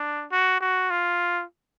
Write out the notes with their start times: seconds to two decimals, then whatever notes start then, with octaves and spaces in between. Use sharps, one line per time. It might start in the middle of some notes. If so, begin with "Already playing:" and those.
Already playing: D4
0.31 F#4
0.60 F#4
0.90 F4